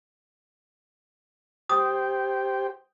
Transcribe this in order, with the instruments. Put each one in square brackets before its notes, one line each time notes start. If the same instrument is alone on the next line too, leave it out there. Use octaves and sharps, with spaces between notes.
[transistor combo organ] G4 C5 G5 [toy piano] D#6